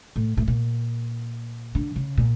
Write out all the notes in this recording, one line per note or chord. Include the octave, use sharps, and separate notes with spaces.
A2
A2
A#2
D3
C#3
A#2